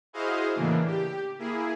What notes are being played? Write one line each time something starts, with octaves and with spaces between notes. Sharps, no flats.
E4 F#4 G#4 C5 D#5 F5
A2 C#3 E3 A#3 D4
G4
A#3 E4 G#4